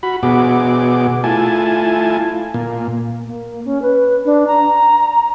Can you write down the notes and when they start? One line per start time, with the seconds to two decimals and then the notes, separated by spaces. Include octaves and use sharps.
0.03 F#4 B5
0.23 B2 B3 F#4 G#4 D6
1.24 A3 E4 F4 G#5 A5
2.54 A#2 A#3
3.26 A#3
3.65 C#4
3.82 B4
4.25 D4
4.47 A#5